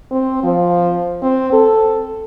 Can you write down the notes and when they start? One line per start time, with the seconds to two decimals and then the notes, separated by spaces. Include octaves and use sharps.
0.11 C4
0.43 F3
1.22 C4
1.52 A4